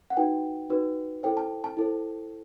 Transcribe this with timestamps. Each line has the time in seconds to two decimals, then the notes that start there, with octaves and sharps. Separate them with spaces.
0.10 F#5
0.17 D#4 F#4 B4 G5
0.70 D#4 F#4 B4
1.23 E4 A4 C5 G5
1.37 A5
1.64 A5
1.77 E4 A4 C5